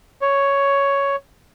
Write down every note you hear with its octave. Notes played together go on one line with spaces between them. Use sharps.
C#5